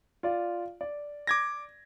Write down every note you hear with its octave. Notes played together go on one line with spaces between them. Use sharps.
F4 D5
D5
D6 G#6 A#6